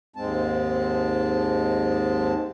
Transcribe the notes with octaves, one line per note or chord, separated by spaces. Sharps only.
D#2 G#2 G#3 C4 A5